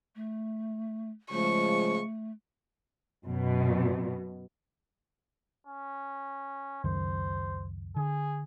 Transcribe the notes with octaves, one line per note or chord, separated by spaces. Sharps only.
A3
C#3 F3 G#3 A3 C#6
F#2 B2
C#4
C#2 F#2 D#3 C5
D3 G#4